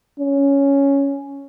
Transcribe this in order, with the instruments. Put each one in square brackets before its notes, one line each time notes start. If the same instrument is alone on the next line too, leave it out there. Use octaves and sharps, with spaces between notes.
[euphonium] C#4